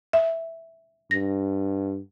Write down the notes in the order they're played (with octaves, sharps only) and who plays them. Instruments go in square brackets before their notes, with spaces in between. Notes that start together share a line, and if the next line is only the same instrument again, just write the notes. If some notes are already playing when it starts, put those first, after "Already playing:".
[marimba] E5
[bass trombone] G2 [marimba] A#6